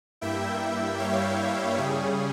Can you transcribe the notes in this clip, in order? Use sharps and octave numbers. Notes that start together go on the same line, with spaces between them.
G2 G3 A#3 E4 E5 G5
C#5 F5
C#3 G3 C#4 G#4